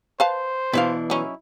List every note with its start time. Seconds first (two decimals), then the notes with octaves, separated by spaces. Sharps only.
0.20 B4 C5 F5 A5
0.73 B2 E3 D4 B4 F5
1.10 F#3 C#4 D#4 E4